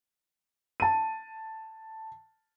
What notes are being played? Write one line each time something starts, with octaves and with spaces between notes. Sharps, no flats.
A5 D#7